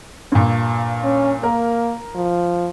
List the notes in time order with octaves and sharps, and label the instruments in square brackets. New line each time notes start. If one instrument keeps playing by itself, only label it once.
[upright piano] G2 A#2
[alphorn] C#4
[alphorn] A#3 [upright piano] A#4
[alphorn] F3